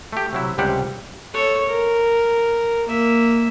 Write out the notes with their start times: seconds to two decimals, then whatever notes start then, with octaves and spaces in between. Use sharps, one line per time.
0.13 A3 G4
0.33 C3 F#3 E4
0.58 C#2 C3 G3 G4 C5 F#5
1.34 A4 C#5
1.67 A#4
2.87 A#3 E5